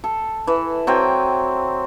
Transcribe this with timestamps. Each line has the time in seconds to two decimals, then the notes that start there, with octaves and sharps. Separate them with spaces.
0.04 A4
0.47 E3
0.87 F#3 C4 G5 G#5